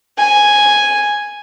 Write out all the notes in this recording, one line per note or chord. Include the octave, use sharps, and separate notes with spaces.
G#5